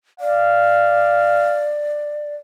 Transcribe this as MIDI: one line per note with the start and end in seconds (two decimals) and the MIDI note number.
0.20 2.36 74
0.20 1.73 77